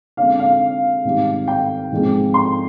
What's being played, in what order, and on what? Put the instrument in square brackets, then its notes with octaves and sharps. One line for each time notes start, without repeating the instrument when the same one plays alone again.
[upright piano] D3 G#3 C4 F5
F5
G#2 D#3 G3 C4
G5
G#2 F3 G#3 C4
C6